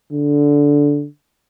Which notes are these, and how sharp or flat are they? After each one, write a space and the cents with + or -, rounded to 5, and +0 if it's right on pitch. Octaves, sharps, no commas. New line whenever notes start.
D3 -15